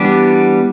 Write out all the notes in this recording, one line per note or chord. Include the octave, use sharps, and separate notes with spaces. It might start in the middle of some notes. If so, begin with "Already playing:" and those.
Already playing: E3 G3 B3 D4 G4